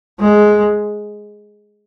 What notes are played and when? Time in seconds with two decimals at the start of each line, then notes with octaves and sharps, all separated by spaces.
0.20 G#3